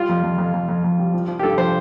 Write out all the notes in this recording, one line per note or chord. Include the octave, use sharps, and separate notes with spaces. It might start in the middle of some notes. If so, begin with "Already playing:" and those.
Already playing: G3 F4
F2
F2
F2
F2
F2
F2
G3
F3
F3
G4
G2 A4
F3 C5